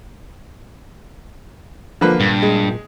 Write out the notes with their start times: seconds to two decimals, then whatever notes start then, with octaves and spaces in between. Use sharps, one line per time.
2.01 D3 F3 A#3 B4
2.20 G2 A#2
2.42 G#3